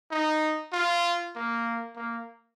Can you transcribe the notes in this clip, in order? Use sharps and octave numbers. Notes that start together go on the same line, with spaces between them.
D#4
F4
A#3
A#3